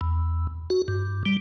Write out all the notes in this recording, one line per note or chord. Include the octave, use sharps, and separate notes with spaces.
E2
F#4
G2
G3